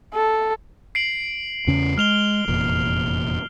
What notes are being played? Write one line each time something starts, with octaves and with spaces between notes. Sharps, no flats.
A4
C7 D7 F#7
E2 C#3 C#4
G#3 F6 F7 G7
F1 E2 A#2